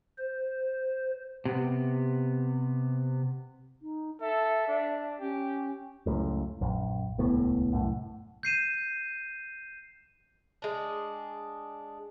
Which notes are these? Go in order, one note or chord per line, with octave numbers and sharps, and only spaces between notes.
C5
C3 B3
D#4
A4 E5
D4
C#4 G4
C#2 F#2 A2
A#1 F#2
D#1 C#2 A2 B3
C2 F#2 A2
G6 C7 D#7 E7
G#3 D4